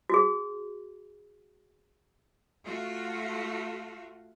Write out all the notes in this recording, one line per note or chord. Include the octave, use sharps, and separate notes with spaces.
F#4 G#4
A3 F4 F#4